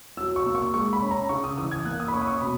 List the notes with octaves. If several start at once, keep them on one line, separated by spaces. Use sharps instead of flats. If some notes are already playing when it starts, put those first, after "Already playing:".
F#3 E6
C#6
A#3
C#6
G#3 C#6
B5
C#4
A#5
C#3 C#6
D#6
E3 D#6
G#6
A#3 F#6
D#6
B5
C#4 C#6
D#6
C#6
B2 B5